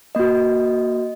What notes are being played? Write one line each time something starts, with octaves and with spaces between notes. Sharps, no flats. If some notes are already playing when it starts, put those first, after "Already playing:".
A#3 F#4 D#5